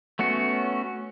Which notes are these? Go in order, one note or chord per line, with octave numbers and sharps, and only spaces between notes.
A3 B3 C#4 F#4